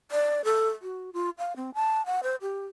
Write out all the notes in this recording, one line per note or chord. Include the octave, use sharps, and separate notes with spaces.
D5
A4
F#4
F4
F5
C4
A5
F#5
C5
G4